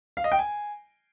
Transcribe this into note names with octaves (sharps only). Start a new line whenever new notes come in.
F5
D#5
G5
G#5